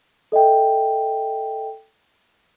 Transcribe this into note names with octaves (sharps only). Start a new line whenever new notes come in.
A4 D#5 E5 G5